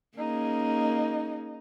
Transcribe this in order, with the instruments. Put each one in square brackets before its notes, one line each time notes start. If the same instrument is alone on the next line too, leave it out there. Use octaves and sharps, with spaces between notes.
[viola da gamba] A#3 C#4 G#4 [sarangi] D#4